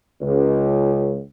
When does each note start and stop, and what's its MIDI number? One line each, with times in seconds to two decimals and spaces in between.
0.21 1.20 37